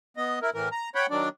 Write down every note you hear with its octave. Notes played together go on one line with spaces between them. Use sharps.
B3 D#5
E4 A#4
A2 E3 A#4
A#5
C#5 F#5 G5 B5
D#3 F#3 D4 D5